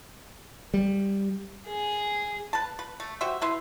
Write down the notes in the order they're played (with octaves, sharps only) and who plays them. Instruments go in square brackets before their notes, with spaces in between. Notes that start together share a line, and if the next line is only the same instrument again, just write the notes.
[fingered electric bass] G3
[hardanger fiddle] G#4
[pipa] B4 A5
B4
A3
F#4 G4 C5 E5
E4 B4 E5 C6